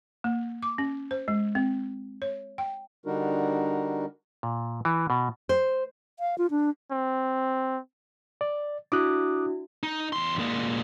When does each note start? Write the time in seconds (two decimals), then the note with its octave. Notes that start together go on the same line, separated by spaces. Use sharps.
0.24 A#3
0.63 D6
0.78 C#4
1.11 C5
1.28 G#3
1.55 C4
2.22 C#5
2.58 G5
3.06 D3 G3 D4 D#4 F#4 A#4
4.43 A#2
4.85 E3
5.10 B2
5.49 C5
6.19 F5
6.38 F4
6.51 D4
6.91 C4
8.41 D5
8.92 D4 E4 F#4 D6 D#6 F#6
9.83 D#4
10.13 E2 C6
10.39 A#2 G#3